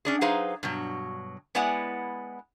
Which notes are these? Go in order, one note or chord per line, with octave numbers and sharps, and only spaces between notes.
C#4 D4 G#4
F#3 D#4 G#4 B4 C5 F5
G2 B2 F#3
G#3 B3 E4 D5 F#5 G#5